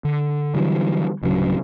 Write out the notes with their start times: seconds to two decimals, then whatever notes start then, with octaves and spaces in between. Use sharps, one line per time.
0.05 D3
0.55 D3 E3 F#3 G3
1.23 D1 G2 C#3 F#3